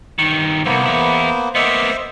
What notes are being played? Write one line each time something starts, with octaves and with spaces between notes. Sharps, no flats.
G2 D#3
C2 F#2 A#3 B3 C5
E2 E4
A#3 B3 C5 D#5 E5